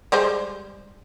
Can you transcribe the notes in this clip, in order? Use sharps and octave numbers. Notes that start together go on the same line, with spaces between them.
G3 G#3 C5